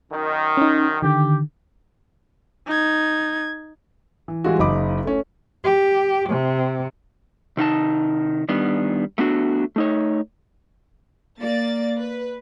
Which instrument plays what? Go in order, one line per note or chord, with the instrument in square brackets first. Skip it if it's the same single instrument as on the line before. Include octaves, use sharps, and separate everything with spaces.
[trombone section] F#2 D#3
[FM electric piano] C#4 D#4
[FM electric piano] D3 D#3 [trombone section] G4
[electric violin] D#4 G#6
[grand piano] E3
E3 G3 G#3 F4 F#4
F#1 D#4 D#5 B5 D6
A3 C#4
[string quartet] G4
C3
[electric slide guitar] C3 D#3 D#4 A5
D#3 G3 B3 D4
A3 B3 D4 F#4
A3 D#4 C#5
[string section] A#3 D5 A6
B4